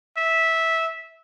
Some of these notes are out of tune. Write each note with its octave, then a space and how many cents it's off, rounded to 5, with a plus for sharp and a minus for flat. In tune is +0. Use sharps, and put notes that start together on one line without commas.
E5 -10